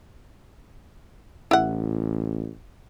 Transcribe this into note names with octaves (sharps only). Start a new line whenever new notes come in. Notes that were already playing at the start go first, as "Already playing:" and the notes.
A1 E4 F#5